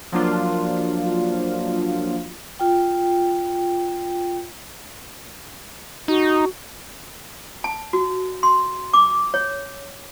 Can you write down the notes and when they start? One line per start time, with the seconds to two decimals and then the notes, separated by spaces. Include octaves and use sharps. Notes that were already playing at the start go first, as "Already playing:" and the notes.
0.12 F3 F#3 A#3 D4 F4
2.60 F4 G5
6.08 D#4 F#4
7.64 A5
7.93 F#4
8.43 C6
8.94 D6
9.34 C#5